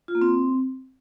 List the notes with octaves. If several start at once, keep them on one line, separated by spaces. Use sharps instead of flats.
F4
A#3
C4